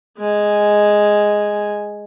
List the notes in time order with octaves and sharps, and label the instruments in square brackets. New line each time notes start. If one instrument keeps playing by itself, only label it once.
[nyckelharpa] G#3 G#5